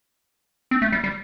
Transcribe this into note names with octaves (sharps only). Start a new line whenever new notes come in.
C4
A3
G3
G3